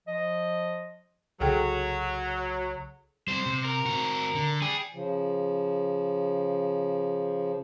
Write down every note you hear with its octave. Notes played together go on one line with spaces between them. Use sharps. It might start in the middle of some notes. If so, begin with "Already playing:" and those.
F3 D#5
C2 C#3 F#3 G#4 A4 G5
G3 C4 C5
C3
A#4
C4 F#4
D3
G#4 D5 G5
C#3 F3